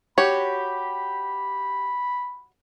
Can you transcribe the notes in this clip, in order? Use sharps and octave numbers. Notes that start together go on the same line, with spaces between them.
F#4 G4 C#5 B5